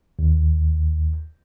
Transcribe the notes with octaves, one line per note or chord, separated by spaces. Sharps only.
D#2